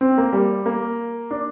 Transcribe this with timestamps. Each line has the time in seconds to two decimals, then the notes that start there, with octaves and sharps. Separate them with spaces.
0.01 C4
0.18 A#3
0.33 G3
0.66 A#3
1.31 D4